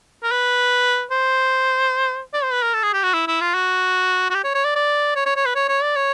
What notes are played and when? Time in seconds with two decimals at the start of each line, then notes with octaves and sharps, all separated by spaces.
0.23 A#4
0.31 B4
1.11 C5
2.33 D5
2.43 C5
2.52 B4
2.63 A#4
2.74 A4
2.83 G#4
2.93 G4
3.03 F#4
3.13 E4
3.28 E4
3.41 F4
3.54 F#4
4.30 F#4
4.34 G4
4.44 C#5
4.55 C#5
4.65 D5
4.75 D5
5.16 C#5
5.26 C#5
5.36 C#5
5.46 B4
5.55 C#5
5.69 C#5
5.82 D5
5.96 C#5